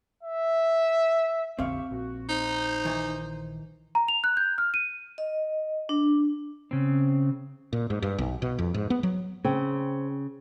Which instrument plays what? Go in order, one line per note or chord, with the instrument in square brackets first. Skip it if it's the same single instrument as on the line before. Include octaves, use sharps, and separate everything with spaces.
[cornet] E5
[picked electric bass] F1 A#1 D3 [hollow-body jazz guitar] C4 F5 [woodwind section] G4 E5 C#6
[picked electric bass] A#1 [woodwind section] F#4
[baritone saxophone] D#4 [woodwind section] C5
[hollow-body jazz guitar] D#3 E3 G#5
[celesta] A#5
F7
F#6
G6
F6
D#7
[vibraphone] D#5
D4
[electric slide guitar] C#3 C4
[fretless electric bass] A#2
G#2
G2
B1
B2
F2
G#2
B3
F#3
[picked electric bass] C#3 [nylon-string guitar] C4